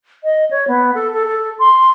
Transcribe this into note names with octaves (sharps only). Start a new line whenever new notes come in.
D#5
C#5
B3
A4
A4
A4
C6